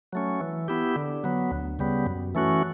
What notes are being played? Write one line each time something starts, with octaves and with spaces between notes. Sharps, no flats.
F#3 A3 C#4
E3
B3 E4 G4
D3
F#3 B3
D2
C#3 G3 B3
F#2
E3 A3 C#4 F#4